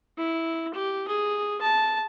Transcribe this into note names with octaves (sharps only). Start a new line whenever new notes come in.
E4
G4
G#4
A5